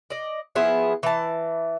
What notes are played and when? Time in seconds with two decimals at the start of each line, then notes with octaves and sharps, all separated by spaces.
0.10 D5 D#5
0.55 F3 B3 E4 G#4
1.03 E3 A5